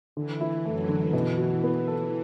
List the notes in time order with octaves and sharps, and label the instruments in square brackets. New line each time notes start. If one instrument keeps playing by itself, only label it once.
[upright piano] D3 [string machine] E3
[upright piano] E4
[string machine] F#2 F#3 [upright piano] A3
[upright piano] D3
[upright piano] B2 [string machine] E3
[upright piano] F#4
B3
A4